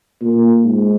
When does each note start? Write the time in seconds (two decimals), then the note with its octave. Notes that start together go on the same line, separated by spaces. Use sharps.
0.22 A#2
0.64 G#2